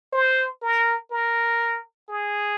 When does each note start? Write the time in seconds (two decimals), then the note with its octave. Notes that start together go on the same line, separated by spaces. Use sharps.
0.13 C5
0.62 A#4
1.11 A#4
2.09 G#4